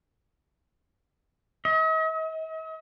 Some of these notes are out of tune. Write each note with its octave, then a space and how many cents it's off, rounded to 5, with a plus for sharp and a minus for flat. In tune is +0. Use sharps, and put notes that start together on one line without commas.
D#5 +45